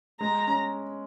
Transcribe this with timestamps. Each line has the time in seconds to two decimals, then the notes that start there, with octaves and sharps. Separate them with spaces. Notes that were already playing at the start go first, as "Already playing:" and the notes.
0.21 G#3 A#5
0.47 C#4